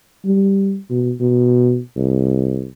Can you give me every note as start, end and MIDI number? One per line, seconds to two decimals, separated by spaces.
0.25 0.78 55
0.90 1.14 47
1.20 1.80 47
1.96 2.67 36